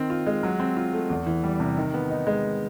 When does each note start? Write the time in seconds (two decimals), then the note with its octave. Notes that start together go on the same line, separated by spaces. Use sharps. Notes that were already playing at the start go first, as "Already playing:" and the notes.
Already playing: D#3 C4
0.10 F4
0.27 G#3
0.43 F#3
0.60 C4
0.77 F4
0.93 A3
1.10 E2
1.27 E3
1.44 G3
1.60 C3
1.77 D#3
1.94 B3
2.10 D#4
2.27 G#3